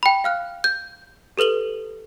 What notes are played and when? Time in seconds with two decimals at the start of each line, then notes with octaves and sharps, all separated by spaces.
0.03 G5 B5
0.24 F5 F6 F#6
0.64 G6
1.37 G4 A4 B4 F#7 G7